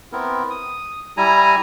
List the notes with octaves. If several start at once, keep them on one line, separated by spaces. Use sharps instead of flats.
B3 C4 E4 A#4
D#6
G3 E4 G#5 A#5